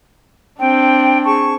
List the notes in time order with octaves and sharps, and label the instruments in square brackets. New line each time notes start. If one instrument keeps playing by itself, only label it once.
[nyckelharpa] C4 D4 [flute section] G5
[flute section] G#4 A5 C#6